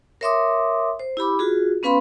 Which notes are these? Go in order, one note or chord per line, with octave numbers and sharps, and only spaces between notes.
A#4 C#5 E5 C6 D6 D#6
C5
E4 G4 B5 D6
F4 F#4 G#4
B3 C#4 B4 F5 B5 C6